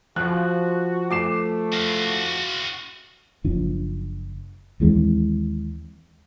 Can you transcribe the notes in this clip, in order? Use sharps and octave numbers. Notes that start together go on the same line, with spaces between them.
F3 F#4 F#6
A3 D6 C7 E7
F#4 F5
F#1 F3 D4
D#2 E3 G#3 C4